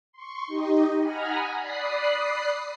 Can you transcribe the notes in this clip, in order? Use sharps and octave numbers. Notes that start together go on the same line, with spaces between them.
C6 C#6
D#4 G4 D#5
F#5 G#5 A#5 B5 D#6 F6
D5 B5 D#6 F#6 C7